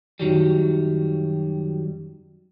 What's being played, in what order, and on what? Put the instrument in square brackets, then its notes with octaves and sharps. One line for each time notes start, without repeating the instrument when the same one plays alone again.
[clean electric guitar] F#2 D#3 F#3 G3